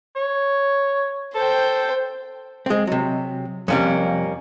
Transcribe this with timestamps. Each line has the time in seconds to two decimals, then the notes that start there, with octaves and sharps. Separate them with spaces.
0.16 C#5
1.35 A4 C5 G5
2.66 G#3 C4
2.87 C3 F#3
3.68 F2 C3 G3 A#3 C#4